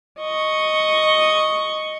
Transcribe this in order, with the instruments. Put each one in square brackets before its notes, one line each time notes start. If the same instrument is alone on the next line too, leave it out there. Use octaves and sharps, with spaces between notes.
[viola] D#5 C#6